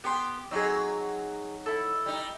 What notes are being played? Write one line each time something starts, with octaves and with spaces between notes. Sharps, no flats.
B3 G4 C6
F#3 C4 D4 D#4 G#4
E4 A4
G3 D#4